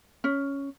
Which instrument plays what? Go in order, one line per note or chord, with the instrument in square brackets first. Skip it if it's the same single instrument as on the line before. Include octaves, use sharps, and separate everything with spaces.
[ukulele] C#4